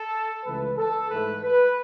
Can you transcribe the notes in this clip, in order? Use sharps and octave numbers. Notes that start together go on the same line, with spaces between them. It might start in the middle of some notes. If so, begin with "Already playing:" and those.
Already playing: A4
C#2 C#3 E3 A3 B4
A4
G#2 E3 A3 B4
B4